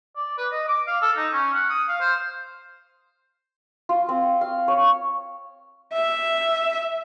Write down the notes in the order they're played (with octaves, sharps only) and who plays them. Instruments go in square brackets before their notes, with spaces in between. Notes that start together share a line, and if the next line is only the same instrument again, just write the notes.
[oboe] D5
B4
D#5
D6
F5
A4
D#4
C#4
F#5
D#6
F5
C5
[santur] F4
C4
F5
C#5
[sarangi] E5